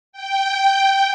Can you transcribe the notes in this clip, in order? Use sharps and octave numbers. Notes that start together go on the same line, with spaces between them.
G5